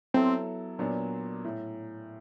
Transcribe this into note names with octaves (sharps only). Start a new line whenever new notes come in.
F#3 B3 C4 E4 A4
A#2 F#3 B3 D4
A2